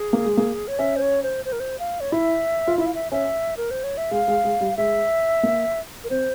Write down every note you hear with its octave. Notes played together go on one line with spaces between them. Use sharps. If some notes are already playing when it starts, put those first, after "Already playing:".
Already playing: G#4
A#3
G#3
A#3
C#5
C#4 E5
C5
C#5
C5
C5
A#4
C5
F5
C#5
E4 E5
F4
E4 E5
F5
E5
C#4 E5
A#4
C5
C#5
E5
G#3 F5
G#3
G#3
G3
G#3 E5
A#3
A#4
C4 C5